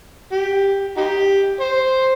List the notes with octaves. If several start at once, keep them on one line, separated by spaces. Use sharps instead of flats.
G4
D#4 G4
C5